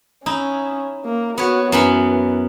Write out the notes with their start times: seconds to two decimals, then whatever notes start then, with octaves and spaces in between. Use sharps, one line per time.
0.26 C#4 D#4 E4
1.05 A#3
1.38 B3 F#4 C#5
1.72 F#2 E3 B3 B5